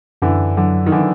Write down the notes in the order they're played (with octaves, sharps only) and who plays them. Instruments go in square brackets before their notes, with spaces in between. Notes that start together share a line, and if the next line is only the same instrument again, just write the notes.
[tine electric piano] F#2 [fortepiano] D3 E3
[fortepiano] D3 [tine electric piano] F#3
[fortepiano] D#3
D3 E3